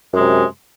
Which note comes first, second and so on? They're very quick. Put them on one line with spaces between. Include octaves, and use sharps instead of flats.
F#2 G#3 C3